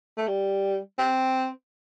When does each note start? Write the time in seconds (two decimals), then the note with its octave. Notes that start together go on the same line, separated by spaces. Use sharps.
0.18 A3
0.28 G3
0.99 C4